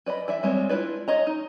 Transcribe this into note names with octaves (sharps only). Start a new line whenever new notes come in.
B4 D5 D#5 B5
E3 D5 E5
G3 G#3 C4 C#5
D4 E4 F4 B4 D5
C#5 D#5 A#5
D#4